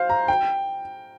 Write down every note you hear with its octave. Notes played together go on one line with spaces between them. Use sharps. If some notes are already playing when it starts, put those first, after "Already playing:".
Already playing: C5 F5
A#5
G5